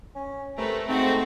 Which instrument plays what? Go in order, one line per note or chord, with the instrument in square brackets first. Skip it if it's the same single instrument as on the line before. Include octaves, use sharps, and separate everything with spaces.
[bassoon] C#4
[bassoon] C3 [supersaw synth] A3 [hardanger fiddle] A#4 B4
[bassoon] G#2 [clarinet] C4 [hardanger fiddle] F#4 C5